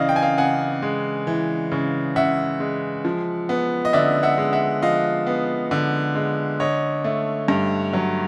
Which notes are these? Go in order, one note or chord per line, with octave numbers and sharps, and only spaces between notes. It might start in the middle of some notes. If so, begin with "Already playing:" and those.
Already playing: C#3 E3 D5 D#5 F5
G5
G#5
F5 G5
C#3 F#5 G#5
G#3
E3
C#3
C#3 E5 F#5
G#3
F3
B3
D#5
D3 D5 E5
E5 F#5
G#3
E5 F#5
F3 D#5 F5
B3
D3
G#3
D3 C#5 D#5
A3
G2
F#3